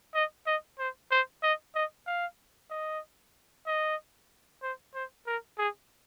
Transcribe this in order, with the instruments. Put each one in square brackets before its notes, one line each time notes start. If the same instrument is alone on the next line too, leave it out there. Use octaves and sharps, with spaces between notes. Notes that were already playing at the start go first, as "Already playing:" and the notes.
[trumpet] D#5
D#5
C5
C5
D#5
D#5
F5
D#5
D#5
C5
C5
A#4
G#4